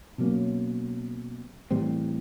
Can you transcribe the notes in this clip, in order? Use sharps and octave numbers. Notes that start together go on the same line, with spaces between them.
B2 F#3 A#3 C#4
A2 E3 G3 C4